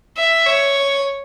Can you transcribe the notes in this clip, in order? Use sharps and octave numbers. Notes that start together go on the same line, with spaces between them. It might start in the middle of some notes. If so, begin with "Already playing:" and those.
E5
C#5